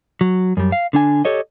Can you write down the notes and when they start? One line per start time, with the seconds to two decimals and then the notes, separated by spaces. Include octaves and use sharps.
0.21 F#3
0.57 F#2 G3
0.72 F5
0.93 D3 D4 G#5
1.25 G4 A4 C#5 D#5